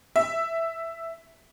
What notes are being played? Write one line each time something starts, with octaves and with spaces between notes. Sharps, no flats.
E5